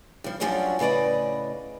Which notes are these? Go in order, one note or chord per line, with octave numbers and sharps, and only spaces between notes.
G2 F3
G2 F3 F#3 C#4 D4 F#4
A2 C#3 B4 D5 D#5